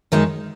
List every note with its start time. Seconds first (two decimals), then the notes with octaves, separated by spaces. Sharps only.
0.12 F#2 D#3 G#3 D#4